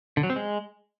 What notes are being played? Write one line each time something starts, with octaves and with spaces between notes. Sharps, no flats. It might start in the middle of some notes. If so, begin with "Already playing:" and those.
D3
F#3
C4
G#3